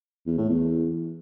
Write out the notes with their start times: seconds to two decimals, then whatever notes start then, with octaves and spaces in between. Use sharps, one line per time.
0.27 E2
0.38 A2
0.49 E2